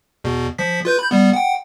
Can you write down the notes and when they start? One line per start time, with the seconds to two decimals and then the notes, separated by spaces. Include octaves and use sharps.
0.24 E2 B2
0.58 F3 B6
0.85 F4 B4 G6
0.99 B5 G6
1.11 G3 B3
1.33 F#5 G5